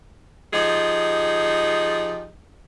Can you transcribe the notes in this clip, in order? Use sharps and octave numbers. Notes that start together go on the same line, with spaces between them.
F3 D#4 G4 G#4